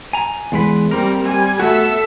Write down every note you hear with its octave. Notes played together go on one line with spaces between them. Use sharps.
G#5 A#5
E2 G#3 B4
G3 A#3 C4 A#4
G3 G#5
A3 B3 F#4 A4 E5